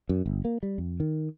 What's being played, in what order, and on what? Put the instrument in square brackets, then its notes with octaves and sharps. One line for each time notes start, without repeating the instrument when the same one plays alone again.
[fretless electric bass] F#2
G1
A#3
G3
F2
D#3